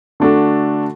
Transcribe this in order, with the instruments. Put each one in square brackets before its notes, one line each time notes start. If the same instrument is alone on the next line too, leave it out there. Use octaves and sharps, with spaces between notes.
[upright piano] D3 A3 D4 F#4 A4